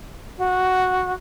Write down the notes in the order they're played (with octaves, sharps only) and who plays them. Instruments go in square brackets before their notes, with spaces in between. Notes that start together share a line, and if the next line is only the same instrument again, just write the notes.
[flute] F#4